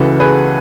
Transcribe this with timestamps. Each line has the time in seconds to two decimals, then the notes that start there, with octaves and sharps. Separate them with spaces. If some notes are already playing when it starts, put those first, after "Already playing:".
Already playing: C#2 C#3 E3 F#4 A4
0.20 G#4 B4